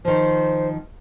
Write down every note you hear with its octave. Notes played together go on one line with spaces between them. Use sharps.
D#3 F3 C5